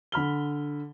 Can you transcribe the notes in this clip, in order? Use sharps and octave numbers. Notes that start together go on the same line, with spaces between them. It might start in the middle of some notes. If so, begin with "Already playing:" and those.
D3 B5 F6 G7